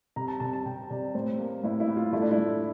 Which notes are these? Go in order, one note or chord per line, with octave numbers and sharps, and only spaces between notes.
C3 A#5
A5
C3 A5
A5
C3 G5
C3 D5
A2 C5
A#3
A2 E4
E4
A2
F4
A3 E4
D4
E4
A3